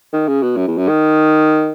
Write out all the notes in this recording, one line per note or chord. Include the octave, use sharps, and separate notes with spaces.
D#3
C#3
B2
F#2
E2
F#2
D#3